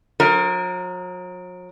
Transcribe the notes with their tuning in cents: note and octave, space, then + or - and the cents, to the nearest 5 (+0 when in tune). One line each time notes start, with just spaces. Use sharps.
F#3 -45 A#4 +0